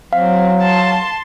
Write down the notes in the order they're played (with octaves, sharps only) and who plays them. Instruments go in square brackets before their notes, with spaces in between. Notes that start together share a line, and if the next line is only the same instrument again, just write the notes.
[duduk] F#3 [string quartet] C4 [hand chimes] F5
[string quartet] A5 C6